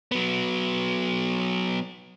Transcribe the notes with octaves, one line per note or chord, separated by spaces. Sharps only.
F#3 B3